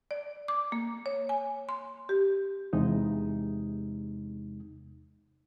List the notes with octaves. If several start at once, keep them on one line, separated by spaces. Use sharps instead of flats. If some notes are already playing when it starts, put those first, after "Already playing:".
D5
D6
A#3
C#5
G#5
C6
G4
E2 C3 G#3 D#4